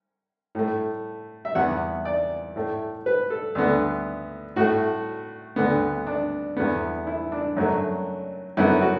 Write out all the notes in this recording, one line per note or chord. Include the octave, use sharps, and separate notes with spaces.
A2 A3
E5
E2 E3 B3 F#5
D5
A2 A3
B4
A4
D2 D3 B3
A2 A3 F#4
D2 D3 B3
D4
E2 D3 B3
E4
D4
F#2 F#3 A3
F#2 D3 B3 E4
F#4